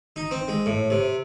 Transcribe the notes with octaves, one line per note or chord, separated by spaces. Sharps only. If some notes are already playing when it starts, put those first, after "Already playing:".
D#4
C4
G#3
A2
C3